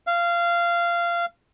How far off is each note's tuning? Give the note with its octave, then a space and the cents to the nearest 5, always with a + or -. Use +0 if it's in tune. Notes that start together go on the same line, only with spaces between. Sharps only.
F5 -20